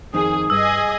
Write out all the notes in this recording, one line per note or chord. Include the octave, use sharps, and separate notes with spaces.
F2 D#3 D#4 G#4 D#6
G2 G#4 D#5 G#5 E6